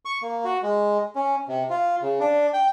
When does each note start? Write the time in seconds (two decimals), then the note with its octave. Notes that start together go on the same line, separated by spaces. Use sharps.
0.05 C#6
0.22 A#3
0.45 F#4
0.63 G#3
1.16 C#4
1.48 C3
1.70 F4
2.02 C#3
2.20 D4
2.54 G5